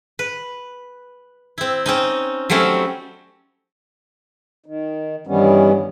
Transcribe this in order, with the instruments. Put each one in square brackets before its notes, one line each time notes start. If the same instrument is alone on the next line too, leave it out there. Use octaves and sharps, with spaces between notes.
[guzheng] B4
C4 E4
C4 C#4 D#4
F#3 G3 A3 C4 C#4
[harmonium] D#3
G2 D#3 E3 G3 B3 C#4